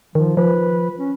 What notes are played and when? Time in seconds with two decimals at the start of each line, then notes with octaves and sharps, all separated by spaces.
0.15 D#3 F3
0.37 F3 B4
0.99 C#4